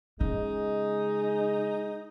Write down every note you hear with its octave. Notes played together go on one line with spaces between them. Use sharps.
C#3 G#3 D#4